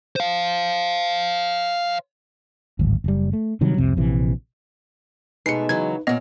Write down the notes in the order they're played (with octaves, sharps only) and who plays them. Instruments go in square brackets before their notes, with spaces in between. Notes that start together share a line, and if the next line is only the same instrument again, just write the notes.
[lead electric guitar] C5 F5
[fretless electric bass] D1 G#1
F#1 G3
A3
C3 D#3 F#3 G3
C2 F2 C3
A#1 C3 E3
[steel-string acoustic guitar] B2 A3 [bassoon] G#3 [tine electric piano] D#4 B4 [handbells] C7 C#7
[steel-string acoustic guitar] C#3 E3 F#3 [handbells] G#6
[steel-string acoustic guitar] A#2 C#4 [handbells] B3 D#5